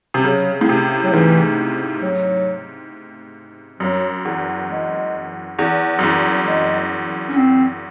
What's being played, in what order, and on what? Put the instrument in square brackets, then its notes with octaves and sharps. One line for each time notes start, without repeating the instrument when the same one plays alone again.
[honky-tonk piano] C3
[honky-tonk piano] C#3 [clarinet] F#3
[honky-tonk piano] A2
C3
[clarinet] F#3
[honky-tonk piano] G#2 [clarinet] E3
[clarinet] F#3
[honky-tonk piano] F#2 [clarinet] F#3
[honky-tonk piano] E2
[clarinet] G#3
[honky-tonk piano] E2
F#2
E2
[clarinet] G#3
C#4
C4